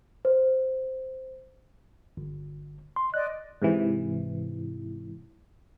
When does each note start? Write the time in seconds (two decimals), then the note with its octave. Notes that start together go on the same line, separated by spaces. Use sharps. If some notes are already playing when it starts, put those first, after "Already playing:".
0.25 C5
2.17 G1
2.96 C6
3.14 D5 D#5 F#6
3.62 G#2 C3 E3